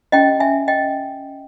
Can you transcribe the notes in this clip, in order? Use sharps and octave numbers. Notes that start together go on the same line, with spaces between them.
C#4 E4 G4 D#5 G5
E5 G#5
D#5 G5